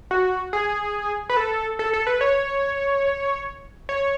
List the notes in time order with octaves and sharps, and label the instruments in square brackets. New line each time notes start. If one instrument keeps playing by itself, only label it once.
[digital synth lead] F#4
G#4
B4
A4
A4
A4
B4
C#5
C#5